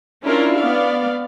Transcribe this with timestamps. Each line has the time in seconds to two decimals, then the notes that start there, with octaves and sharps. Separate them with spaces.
0.24 C#4 D4 E4 F4 A#4
0.57 B3 D5 F5